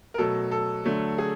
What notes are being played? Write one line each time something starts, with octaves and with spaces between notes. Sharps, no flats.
A#4
B2 F#3 A3 A4
A4
D3 F#3 A3
G#4